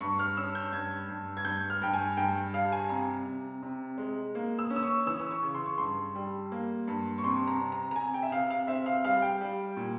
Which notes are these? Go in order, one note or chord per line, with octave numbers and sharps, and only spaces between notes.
G2 C#6
F6
C#4 E6
G6
G2 G#6
G2
G#6
G2 G6
F6
G2 G5
G#5
G2 G5
G3 F5
G#5
C3 A#5
C3
C3
G#3
A#3
E6
C#4
E6
C#6
E3 E6
E6
C#6
C#3
C6
C#6
G2 C6
G3
A#3
G2
C#6
C3 C6
A#5
C3
A#5
A#5
C3 G#5
G5
E5
C3 F5
F5
C4 E5
F5
G3 F5
G5
G3
A#2